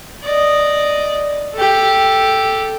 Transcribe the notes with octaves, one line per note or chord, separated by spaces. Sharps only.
D5 D#5
G4 A4